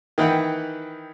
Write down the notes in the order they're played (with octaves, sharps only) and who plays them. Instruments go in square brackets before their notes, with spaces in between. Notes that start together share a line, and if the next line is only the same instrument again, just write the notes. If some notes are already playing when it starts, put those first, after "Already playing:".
[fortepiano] D#3 E3 B4 F#5 G5